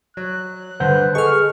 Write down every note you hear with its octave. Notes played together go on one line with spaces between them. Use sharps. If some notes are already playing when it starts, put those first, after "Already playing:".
F#3 F#6
G2 D3 B4 C5 F#5 G6
G#4 A4 D#5 C#6 F6